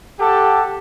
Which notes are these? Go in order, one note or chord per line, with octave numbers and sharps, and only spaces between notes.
G4 A4 F#5 A5 D6